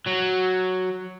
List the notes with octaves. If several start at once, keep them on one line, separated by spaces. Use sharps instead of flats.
F#3